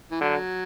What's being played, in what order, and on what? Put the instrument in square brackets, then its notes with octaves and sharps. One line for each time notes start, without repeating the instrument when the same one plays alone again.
[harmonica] E3
[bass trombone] D3 [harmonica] F#3